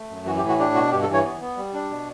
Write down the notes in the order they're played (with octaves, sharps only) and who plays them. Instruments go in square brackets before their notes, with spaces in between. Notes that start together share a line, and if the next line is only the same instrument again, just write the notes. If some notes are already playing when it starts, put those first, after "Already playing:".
Already playing: [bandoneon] A3
F#2
E3 F#4
G4
A2
F#4
D4 G4
B2 F#4
G2 G4
A4
E3
C#5
B3
B3
G3
D4
B2